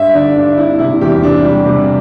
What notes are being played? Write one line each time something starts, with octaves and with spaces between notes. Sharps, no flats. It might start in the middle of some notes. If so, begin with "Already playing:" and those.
Already playing: G2 E5
D3 D5
G2 D4
C4 E4
C3 E4
E2 G4
C3 D4
G3
C3